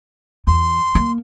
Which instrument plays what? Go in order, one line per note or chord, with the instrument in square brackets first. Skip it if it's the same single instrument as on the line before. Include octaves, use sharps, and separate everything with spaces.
[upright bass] E2 [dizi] C6
[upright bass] A#3